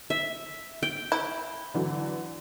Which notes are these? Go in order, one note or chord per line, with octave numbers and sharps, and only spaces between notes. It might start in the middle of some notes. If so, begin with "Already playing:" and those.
E5
G5
E4
D3 E3 F#3